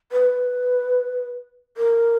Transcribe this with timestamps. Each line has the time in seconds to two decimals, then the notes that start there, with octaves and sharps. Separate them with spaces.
0.12 B4
1.77 A#4